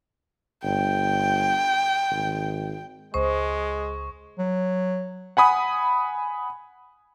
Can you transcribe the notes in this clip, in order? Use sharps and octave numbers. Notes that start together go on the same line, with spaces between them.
G1 G5
G#1
C#2 G#3 C5 C#6 D#6
F#3
F#5 G#5 B5 D#6